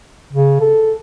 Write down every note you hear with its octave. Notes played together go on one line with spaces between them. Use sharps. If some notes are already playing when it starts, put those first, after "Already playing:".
C#3
A4